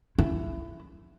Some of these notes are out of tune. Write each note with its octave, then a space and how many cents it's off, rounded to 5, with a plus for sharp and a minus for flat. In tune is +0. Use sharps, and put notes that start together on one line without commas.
E4 +20